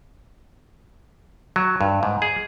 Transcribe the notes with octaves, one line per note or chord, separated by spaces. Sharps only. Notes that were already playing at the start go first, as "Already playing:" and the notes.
F#3
G2
G#2
G#4